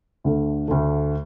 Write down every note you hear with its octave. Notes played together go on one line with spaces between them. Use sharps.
D2 D3 A3
D2 D3 A3